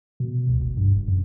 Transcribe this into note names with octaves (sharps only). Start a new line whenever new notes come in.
B2
C#2
G1
G2
D#1
F#2